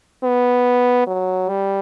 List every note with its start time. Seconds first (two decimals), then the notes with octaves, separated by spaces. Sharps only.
0.23 B3
1.07 F#3
1.49 G3